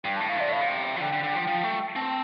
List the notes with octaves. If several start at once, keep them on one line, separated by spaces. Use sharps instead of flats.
G2 G5
A2 A5
F5
C3 D5
A2 F5
C3
G5
F3
D3 G5
D3
D3
F3
F3
A3
C4 A5